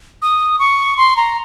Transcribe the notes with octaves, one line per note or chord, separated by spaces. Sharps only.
D#6
C#6
C6
A#5